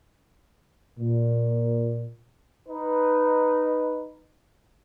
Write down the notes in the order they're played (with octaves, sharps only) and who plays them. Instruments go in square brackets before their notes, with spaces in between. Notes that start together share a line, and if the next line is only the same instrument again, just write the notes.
[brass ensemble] A#2
[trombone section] D#4 B4